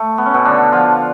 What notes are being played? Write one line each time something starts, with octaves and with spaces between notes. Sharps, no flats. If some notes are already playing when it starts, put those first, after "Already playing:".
Already playing: A3
B3
C#4
B2 B3
D3 D4
F3 F4